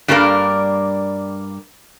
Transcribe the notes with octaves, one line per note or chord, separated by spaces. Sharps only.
G2 G3 A#3 D4 A#4 D5